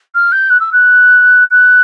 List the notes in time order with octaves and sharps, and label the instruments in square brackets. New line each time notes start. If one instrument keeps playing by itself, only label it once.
[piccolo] F6
G6
F#6
E6
F#6
F#6